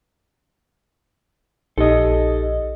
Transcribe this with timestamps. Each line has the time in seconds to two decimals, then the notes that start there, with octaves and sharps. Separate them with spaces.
1.78 A#1 D#4 G4 A4 D#5